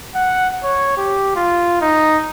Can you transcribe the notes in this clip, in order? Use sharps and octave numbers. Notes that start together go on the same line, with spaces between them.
F#5
C#5
G4
F4
D#4